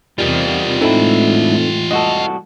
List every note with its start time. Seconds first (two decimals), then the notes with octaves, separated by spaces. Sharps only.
0.18 E2 C3 D#3 G3 F4 G4
0.81 A2 D3 E3 G#3 C4 D#4 E4 A4
1.91 C2 F#4 A4 D#5